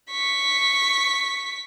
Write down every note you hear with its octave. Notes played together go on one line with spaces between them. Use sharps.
C#6 B6